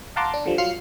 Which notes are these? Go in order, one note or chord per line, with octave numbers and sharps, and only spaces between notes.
F5 F#5 A5 A#5 C6 D6
D4
D3 F3 G3
F#3 F4 F6 C7 C#7